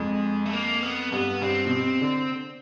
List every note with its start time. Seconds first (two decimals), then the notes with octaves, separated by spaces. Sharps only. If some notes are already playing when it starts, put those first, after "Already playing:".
Already playing: F2 G#3
0.46 A3
0.53 A#3
0.83 B3
1.12 G2 B3
1.42 G2 C4
1.66 B2
1.71 C3
2.01 D3